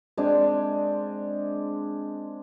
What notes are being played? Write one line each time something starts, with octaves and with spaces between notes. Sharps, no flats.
G#3 C4 D4